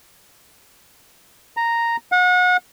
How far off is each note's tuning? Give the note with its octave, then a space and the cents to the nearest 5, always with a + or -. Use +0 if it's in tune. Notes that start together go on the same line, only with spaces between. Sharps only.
A#5 -5
F#5 -35